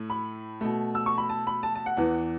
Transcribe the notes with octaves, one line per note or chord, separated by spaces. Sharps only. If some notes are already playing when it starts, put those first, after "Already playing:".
Already playing: A2 A3
B5
B2 A3
E6
C#6
B5
A5
B5
A5
A5
F#5
E2 E3 B3